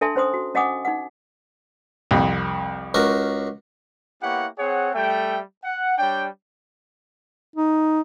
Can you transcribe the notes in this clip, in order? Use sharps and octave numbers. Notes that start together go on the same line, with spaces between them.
D4 A4 E5 G#5 A5 C6
C#4 C5 C6 D#6
F#4
C#4 D#5 F#5 G#5 D6 D#6
D#4 F#5
C2 F2
C#2 F#4 A#4
A#3 B3 E4 G4 C#5 F#5
C4 G#4 C#5 F#5
G3 A3 E5 G5
F#5
G3 D4 C#5 G5
D#4